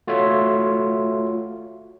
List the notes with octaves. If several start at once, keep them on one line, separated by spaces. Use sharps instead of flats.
A3 F4 F#4 C#5 E5